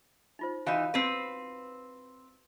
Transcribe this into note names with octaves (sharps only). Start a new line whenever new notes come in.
D#4 F4 C5
E3 D#4 F#4 F5 B5
C4 B4